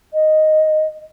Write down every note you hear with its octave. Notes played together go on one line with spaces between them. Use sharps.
D#5